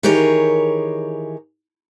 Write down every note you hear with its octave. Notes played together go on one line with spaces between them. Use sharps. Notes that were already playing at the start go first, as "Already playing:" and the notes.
D#3 E3 G4 G#4 A#4 C#5